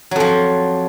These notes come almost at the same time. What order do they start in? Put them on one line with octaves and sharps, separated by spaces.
F#3 F2 F3